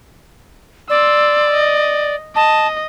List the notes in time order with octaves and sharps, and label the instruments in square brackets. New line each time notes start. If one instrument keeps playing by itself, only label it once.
[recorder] D5 [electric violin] C6 E6
[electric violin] D#5
[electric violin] D#5 [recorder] A5